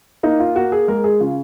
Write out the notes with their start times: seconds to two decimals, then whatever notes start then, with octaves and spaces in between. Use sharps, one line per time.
0.23 A#3 D#4
0.40 F4
0.55 A#3 F#4
0.72 G#4
0.88 G#3 A#4
1.04 G#4
1.20 C#3 F4